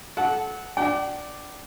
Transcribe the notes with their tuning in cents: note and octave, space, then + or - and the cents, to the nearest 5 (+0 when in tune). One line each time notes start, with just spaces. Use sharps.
A4 -30 F#5 +0 A5 -25
D4 +0 G5 -45